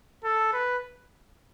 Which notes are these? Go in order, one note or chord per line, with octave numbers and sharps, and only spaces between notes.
A4
B4